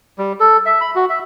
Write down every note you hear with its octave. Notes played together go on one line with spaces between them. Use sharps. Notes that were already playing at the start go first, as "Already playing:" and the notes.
G3
A4
E5
B5
F#4
E5